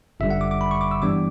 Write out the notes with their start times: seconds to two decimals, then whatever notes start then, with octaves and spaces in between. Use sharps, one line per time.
0.20 G1 F#2 D3 G3 E5
0.30 F#5
0.41 D6
0.51 D6
0.61 B5
0.71 C#6
0.81 D6
0.91 E6
1.02 G2 E3 G3 B3 D4 D6